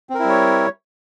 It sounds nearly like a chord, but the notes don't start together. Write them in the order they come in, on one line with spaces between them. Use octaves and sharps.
C4 A#4 E4 G3 C#5